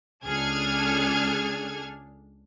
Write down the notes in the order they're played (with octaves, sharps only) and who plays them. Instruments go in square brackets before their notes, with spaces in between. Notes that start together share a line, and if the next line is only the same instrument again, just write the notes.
[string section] C#2 D4 G#4 A4 F6 G#6